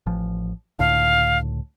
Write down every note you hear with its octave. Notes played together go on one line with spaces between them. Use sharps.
A1 F3
C#2 A2 D3 F5